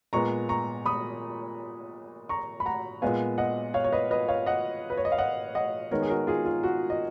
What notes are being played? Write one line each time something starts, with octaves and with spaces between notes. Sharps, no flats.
A#2 G#3 B3 A#5 C#6
A#5 C#6
B5 D#6
A#5 C#6
B5
F#5 A#5
A#2 G#3 B3 F5 G#5
D#5 F#5
C#5 F5
C#5
B4 D#5
B4 D#5
C#5 F5
D#5 F#5
B4
C#5
D#5
F5
D#5 F#5
D#5 F#5
D#3 G#3 B3 A#4 C#5
G#4
F#4 A#4
F4 G#4
F4
F#4
D#5